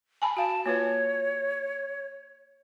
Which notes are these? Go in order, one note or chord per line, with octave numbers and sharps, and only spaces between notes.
G#5 A5 B5
F#4 F5 A5
A#3 F4 B4 C#5